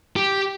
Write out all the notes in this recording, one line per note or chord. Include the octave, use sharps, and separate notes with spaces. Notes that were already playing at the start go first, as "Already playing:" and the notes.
G4